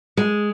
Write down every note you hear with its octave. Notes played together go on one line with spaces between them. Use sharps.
G#3